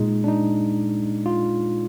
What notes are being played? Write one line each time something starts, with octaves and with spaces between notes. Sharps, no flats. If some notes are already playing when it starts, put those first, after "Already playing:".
Already playing: A#2 G#3 D#4
D4
D#4
F4